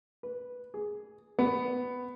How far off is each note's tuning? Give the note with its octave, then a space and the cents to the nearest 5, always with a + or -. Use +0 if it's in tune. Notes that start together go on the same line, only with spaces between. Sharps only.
B4 -5
G#4 +5
B3 +10